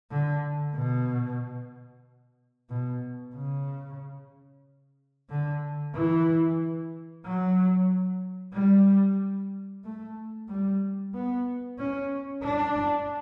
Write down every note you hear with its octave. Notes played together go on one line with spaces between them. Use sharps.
D3
B2
B2
C#3
D3
E3
F#3
G3
A3
G3
B3
C#4
D4